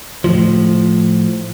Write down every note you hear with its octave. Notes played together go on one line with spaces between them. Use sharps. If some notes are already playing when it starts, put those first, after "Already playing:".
A2 F3